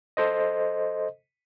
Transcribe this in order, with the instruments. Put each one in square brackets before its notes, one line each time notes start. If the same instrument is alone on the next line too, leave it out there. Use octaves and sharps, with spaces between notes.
[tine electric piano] A4 C5 D#5